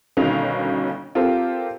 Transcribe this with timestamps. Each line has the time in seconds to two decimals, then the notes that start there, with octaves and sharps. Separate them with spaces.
0.17 G1 B2 D#3 C#4 F5 F7
1.15 C4 F4 G4 A4 A#4 C5